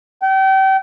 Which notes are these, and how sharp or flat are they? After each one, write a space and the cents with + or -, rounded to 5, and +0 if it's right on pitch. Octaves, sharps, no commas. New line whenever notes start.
G5 -35